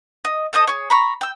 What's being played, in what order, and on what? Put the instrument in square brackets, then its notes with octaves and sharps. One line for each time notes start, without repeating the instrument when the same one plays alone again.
[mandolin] D#5
A4 C5 D#5 D#6
G#4 C#5
A#5 B5 C#6
G5 E6